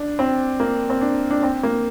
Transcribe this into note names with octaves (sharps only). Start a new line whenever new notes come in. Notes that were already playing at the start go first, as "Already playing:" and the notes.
Already playing: D4
C4
A#3
C4
D4
D4
C4
A#3